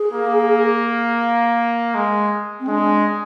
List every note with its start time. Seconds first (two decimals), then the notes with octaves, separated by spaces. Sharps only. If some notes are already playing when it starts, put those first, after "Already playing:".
Already playing: G#4
0.13 A#3
1.95 G#3
2.60 C4
2.68 G#3 D4